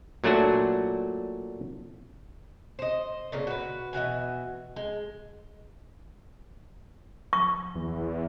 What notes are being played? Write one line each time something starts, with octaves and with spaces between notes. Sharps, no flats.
A#2 F#3 A3 D4 F#4
C5 D#5
A#2 C#3 A#3
F#4 B4
B2 E3 F#4 G#5
G#3
C#6
E2